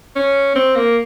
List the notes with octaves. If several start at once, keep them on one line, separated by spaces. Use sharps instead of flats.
C#4
C4
A#3